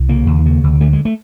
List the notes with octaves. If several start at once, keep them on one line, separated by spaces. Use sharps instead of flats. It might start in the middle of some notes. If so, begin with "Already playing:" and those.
Already playing: C2
C#3 A#3
D#2
C#3
D2
D3 A3
G#3
A3